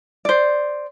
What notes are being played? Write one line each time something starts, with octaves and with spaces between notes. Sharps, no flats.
C5 D5